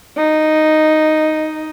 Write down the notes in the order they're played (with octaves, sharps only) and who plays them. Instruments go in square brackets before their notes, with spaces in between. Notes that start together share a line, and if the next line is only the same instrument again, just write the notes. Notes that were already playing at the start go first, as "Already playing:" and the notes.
[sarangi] D#4